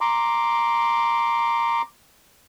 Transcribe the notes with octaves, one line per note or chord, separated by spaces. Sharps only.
A#5 C6 D6